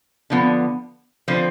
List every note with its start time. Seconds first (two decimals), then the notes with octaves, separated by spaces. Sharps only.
0.30 D3 F3 B3
1.28 D3 F3 C4 C5